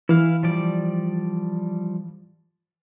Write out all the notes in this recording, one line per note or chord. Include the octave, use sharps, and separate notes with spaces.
E3 E4 F5
F3 G3 D5